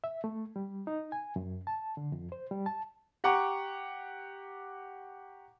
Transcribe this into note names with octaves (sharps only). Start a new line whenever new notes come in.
E5
A3
G3
D#4
G#5
F#2
A5
D3
F2
C5
G3
A5
G4 F#5 A#5 C#6 D6